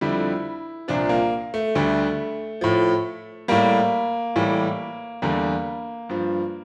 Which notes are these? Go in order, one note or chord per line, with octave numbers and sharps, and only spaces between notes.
F2 D3 G3 E4
C2 A#2 F3 D4
A#3
A3
D2 D3 G3
A2 F3
A2 G3 A#3
A2 E3 G3
E2 D3 G3 A#3
G2 F3